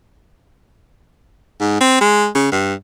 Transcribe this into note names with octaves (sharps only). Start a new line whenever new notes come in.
G#2
C4
G#3
C#3
G2